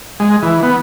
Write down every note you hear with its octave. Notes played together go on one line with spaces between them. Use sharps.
G#3
E3
B3